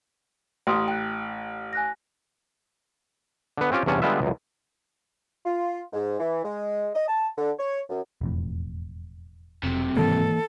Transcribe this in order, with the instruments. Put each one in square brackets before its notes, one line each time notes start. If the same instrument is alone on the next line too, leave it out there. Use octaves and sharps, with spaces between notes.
[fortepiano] A1 [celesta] G5 C6 D#6
[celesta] G5 F#6
G#5 F#6 A#6
[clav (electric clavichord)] D3 B3
C4 C#4 F4 G4
E2 G2 C3 C#4 A5
D3 G3 G#3 B3 F4 E5
C#2 F#2
[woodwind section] F4
G#2
E3
G#3
D#5
A5
D3
C#5
F#2
[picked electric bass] E1 F2 A2
[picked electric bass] F1 [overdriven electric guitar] B1 C3
[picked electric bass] G#2 D#3 G#3 [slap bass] E3 A#3 [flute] A4